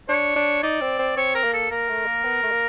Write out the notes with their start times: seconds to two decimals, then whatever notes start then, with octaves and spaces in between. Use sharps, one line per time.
0.09 D4 C#5
0.36 D4
0.63 D#4 D5
0.81 C4
0.99 C4
1.17 C4 C#5
1.35 A#4
1.44 A#3
1.53 A4
1.71 A#3 A#4
1.88 A3
2.06 A#3
2.25 B3
2.43 A3
2.52 A#3